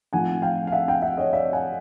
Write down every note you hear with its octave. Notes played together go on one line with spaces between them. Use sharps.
A2 F3 A3 C4 D#4 F#5 G#5
F5 G5
F5
E5 F#5
F5 G5
E5 F#5
C#5 D#5
D5 E5
F#5 G#5